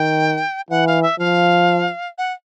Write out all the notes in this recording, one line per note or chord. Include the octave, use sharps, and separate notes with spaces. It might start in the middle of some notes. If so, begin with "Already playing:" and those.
Already playing: D#3 G5
E3 F#5
F5
E5
F3 F5
F#5